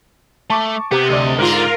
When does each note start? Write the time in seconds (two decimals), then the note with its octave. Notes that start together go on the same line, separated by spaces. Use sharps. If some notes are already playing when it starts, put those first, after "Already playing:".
0.50 A3 A5 C#6 D6
0.91 C3 B3 G4
1.10 D2 A4 D5 D#5
1.38 G#2 D3 F4 A#4